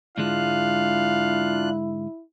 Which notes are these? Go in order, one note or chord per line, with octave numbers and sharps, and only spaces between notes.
G#2 D3 G#3 D4 E4 F4 F5 F#6